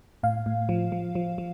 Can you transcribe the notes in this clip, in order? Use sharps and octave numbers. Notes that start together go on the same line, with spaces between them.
A2 F5
A2
F3
F3
F3
F3